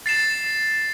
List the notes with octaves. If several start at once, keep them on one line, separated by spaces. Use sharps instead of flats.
A6 C7 E7